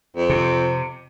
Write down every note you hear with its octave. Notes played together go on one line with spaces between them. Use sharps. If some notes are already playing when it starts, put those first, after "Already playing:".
F2
C3